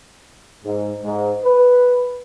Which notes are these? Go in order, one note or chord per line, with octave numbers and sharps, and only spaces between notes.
G#2
G#2
B4